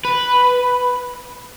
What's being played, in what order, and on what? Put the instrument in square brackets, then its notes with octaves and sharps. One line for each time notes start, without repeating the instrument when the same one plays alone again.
[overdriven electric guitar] B4